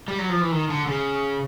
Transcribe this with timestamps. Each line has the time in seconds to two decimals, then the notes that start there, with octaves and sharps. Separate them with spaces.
0.08 G3
0.19 F#3
0.29 F3
0.41 E3
0.52 D#3
0.70 D3
0.87 C#3